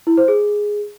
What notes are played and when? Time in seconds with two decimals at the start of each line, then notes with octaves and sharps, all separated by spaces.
0.07 E4
0.17 C5
0.28 G#4